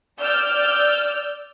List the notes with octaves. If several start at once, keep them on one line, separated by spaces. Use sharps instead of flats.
D5 E6 F6 G6